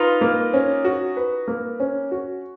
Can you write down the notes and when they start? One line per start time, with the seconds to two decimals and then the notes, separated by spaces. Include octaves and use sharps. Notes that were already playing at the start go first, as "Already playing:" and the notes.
Already playing: D#4 F4 B4
0.21 A#3
0.54 C#4
0.85 F#4
1.17 B4
1.48 A#3
1.80 C#4
2.11 F#4